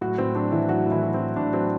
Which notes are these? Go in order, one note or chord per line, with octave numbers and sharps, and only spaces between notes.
A2 F#3 F#4
A2 C4
F#3 D4
E3 F#3 E4
F#3 F#4
A2
E3 E4
F#3
C4
F#3
A2 D4
F#3 C4